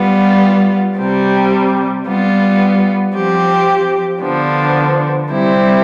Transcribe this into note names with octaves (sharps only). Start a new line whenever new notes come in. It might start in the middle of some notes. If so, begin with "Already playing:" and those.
Already playing: G3 B3 F4
C3 G3 C4 G4
G3 B3 F4
F3 C4 G4
D3 F3 B3 D4
C3 G3 C4 E4 G4